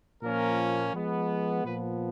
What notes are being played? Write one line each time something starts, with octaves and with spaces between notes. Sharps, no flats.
A#2 F3 A#3 C#4 A#4
F3 G#3 B3
A#2 F3 B3 B4